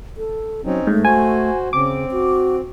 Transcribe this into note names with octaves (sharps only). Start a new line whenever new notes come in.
A4
F#3 C4 C#4 D#4
G#2 A3
F#4 C5 G#5
C#3 C4 D6
F#4